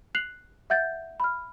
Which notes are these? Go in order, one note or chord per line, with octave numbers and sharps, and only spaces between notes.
F#6 C7 F7 F#7
E5 F#5 G6 A6
B5 F6